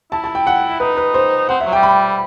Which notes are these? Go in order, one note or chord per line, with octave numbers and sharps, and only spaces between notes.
E4 A5
A5
G5
F#5
D#4 B4
B4
C5
C4 F#5
E5
F#3
G3 G5
B5